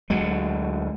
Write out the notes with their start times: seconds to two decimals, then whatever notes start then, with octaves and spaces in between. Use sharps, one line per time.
0.10 D2 F#3 G#3